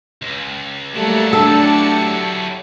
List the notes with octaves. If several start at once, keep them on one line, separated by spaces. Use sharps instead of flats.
C#2
F#3 G3 A3 A#3 E4 G4 A5 C#7
A3 D4 A4